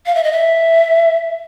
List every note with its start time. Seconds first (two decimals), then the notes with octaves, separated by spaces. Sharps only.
0.06 F5
0.15 E5
0.24 D#5
0.32 E5